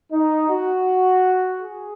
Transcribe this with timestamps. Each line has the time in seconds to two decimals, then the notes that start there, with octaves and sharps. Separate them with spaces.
0.12 D#4
0.50 F#4
1.61 G#4